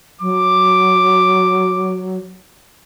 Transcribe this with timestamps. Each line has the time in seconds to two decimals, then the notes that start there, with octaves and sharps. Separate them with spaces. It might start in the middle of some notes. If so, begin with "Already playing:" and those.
0.21 F#3 D6